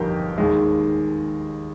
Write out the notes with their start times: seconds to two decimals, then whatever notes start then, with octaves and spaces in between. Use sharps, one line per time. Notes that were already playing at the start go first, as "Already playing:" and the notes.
Already playing: G1 F2 D#4 G4 A#4
0.38 D#2 D#3 G#3